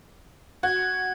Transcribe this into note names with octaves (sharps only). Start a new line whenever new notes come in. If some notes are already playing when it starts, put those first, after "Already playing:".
F#4 G#6